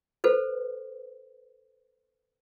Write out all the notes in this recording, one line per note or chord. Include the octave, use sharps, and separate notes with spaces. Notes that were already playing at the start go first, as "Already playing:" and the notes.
A4 B4 C5